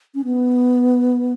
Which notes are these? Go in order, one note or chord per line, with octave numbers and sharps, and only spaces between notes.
C#4
B3